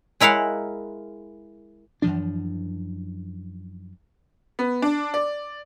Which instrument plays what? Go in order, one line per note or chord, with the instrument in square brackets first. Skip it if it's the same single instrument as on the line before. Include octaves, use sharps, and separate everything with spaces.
[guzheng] G#3 E4 A#4 F5 F#5
[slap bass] F#2 E3 F3 D4
[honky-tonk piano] B3
D4
D5